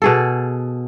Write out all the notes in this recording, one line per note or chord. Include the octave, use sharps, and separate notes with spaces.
B2 G#4 A4